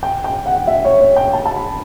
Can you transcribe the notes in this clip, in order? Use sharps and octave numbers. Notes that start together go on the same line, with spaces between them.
G5
G5
F#5
E5
C#5
C#5
G5
A5
A5
B5